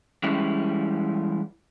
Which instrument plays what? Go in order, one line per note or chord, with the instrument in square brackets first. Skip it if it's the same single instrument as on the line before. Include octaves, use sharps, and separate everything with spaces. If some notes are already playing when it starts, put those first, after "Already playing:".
[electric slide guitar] E3 G3 G#3 C#4 E4